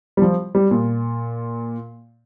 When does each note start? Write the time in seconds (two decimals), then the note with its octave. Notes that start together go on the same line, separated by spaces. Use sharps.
0.17 G3
0.22 F3
0.55 G3
0.71 A#2